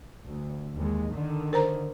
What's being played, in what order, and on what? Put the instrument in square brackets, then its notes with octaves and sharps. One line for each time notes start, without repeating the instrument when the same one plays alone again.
[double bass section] D2
D#2 G#3
D3 D#3
[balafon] A#4 C5 A#5